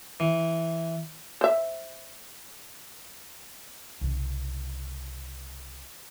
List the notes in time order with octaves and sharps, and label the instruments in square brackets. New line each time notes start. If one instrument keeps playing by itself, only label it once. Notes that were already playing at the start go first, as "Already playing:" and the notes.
[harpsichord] E3
[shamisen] C5 E5
[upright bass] C2 C#3